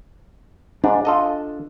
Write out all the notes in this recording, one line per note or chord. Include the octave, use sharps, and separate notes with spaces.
G#2 D4
F4 A4 D#5